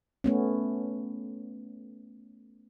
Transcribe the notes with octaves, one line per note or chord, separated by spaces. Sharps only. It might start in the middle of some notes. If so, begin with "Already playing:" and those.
A3 B3 C#4